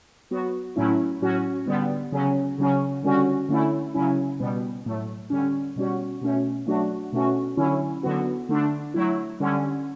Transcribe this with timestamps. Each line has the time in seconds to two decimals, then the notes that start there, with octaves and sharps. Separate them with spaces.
0.31 F#3 B3 F#4
0.76 A2 F#3 A3 C#4 E4
1.22 A2 F#3 C#4 F#4
1.67 D3 G3 B3
2.12 C#3 F#3 C#4
2.58 C#3 F#3 C#4
3.03 D3 G3 C#4 F#4
3.49 D3 A3 C#4 E4
3.94 C#3 F#3 C#4 E4
4.39 B2 G3 B3
4.86 A2 F#3 A3
5.30 D3 G3 C#4
5.76 B2 G3 C#4 F#4
6.21 B2 A3 C#4
6.67 F#3 A3 D4 F#4
7.13 B2 A3 C#4 F#4
7.57 D3 F#3 C#4 E4
8.03 D3 F#3 B3 F#4
8.49 D3 A3 D4
8.94 F#3 A3 E4
9.40 D3 G3 C#4